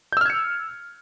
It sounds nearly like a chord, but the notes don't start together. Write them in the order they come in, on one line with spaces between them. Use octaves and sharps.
G6 E6 F6 G#6 C#7